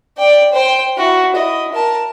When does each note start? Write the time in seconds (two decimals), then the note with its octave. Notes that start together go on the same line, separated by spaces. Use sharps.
0.17 D5 G5
0.53 C5 G5
0.98 E4 F#4
1.35 E4 D#5
1.72 A#4 A5